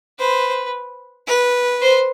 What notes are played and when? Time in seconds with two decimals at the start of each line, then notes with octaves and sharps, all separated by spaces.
0.19 B4 C5
1.27 B4
1.82 C5